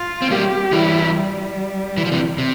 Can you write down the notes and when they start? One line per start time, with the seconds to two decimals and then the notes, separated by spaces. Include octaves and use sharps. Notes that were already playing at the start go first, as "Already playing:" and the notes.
Already playing: F4
0.22 C4
0.31 G3 A#3 G4
0.73 E3 G3 E4
1.14 G3
1.97 E3
2.05 F3
2.12 C3 E3
2.38 C3